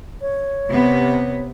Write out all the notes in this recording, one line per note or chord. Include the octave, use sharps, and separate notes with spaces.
C#5
C3 B3